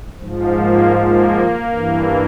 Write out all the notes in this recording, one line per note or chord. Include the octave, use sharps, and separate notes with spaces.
G#2 F3
A#3
A#3
G2 E3